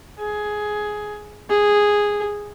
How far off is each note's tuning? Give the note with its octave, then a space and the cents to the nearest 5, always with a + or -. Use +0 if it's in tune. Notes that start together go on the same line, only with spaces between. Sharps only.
G#4 +10
G#4 -5